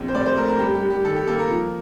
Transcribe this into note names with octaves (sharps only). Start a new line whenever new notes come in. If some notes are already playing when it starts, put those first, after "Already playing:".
Already playing: A#1 F3 C4
C5
A2 D5
C5
A3 A#4
A#4
G2 G4
G4
G2
G4
D#3 A4
G4
A#3 A4
A#4
F3